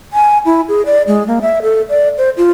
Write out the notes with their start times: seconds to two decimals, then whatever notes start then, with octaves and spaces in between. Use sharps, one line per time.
0.13 G#5
0.45 E4
0.68 G#4
0.86 D5
1.07 G#3
1.27 A#3
1.42 E5
1.62 A4
1.89 D5
2.18 C5
2.37 F4